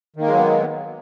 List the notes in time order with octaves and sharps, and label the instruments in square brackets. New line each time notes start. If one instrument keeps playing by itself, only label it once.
[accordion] D#3
A#3
G#3
F#3
B3